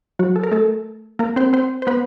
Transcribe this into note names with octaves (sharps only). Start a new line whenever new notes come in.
F#3 F#4
A4
A#4
A3 A4
A#3 A#4
C4 C5
C4 C5
C5
B3 B4